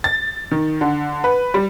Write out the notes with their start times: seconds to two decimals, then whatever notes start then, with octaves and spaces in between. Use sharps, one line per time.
0.04 A6
0.51 D#3
0.81 D3
1.24 B4
1.54 G3